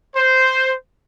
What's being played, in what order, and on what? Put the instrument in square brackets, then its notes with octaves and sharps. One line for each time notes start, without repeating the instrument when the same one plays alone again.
[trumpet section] C5